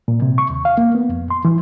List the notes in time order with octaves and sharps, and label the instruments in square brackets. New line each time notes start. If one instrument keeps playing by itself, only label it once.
[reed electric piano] A#2
C3
C#6
D#2
F5
A#3
B3
F2
C6
E3